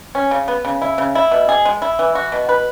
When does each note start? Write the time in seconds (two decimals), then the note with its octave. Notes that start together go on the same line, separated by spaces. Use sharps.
0.15 C#4
0.31 C#3
0.48 B3
0.65 C#3
0.82 E4
0.98 C#3
1.15 E4
1.32 B2
1.49 G#4
1.65 G#3
1.82 E4
1.99 E3
2.15 F#4
2.32 B2
2.49 B4